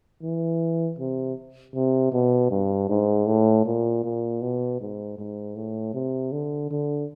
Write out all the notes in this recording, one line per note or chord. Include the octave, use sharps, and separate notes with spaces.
E3
C3
C3
B2
G2
G#2
A2
A#2
A#2
B2
G#2
G#2
A2
C3
D3
D3